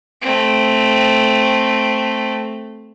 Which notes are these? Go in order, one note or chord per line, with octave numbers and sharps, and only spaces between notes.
A3 C4